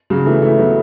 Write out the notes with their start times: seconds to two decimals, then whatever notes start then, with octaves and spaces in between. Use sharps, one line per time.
0.10 C#3 F#3
0.26 E3 A3
0.42 E3 A3
0.58 F#3 B3